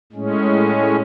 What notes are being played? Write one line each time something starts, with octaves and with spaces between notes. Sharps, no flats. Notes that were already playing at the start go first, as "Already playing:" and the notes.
A2 G#3 C#4